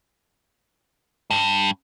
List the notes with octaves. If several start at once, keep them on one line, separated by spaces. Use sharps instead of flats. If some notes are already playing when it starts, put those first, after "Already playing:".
G2